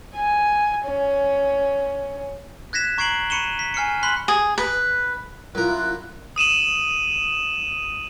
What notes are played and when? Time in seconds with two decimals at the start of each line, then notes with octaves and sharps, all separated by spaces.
0.15 G#5
0.86 C#4
2.73 F#6 G#6 A#6 B6 E7
2.98 A#5 C#6 G#6 C7 D7 F#7
3.30 B5 C#6 C#7 D#7 E7 G7
3.59 B6
3.74 G#5 F6 C7 C#7
4.03 B5 C6 F#6 B6 F#7
4.28 G#4
4.58 B4
5.55 F#2 E4 F4 A#4 F#6
6.36 D#6 D#7 E7 F#7